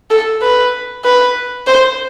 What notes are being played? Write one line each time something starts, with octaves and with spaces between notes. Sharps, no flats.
A4
B4
B4
C5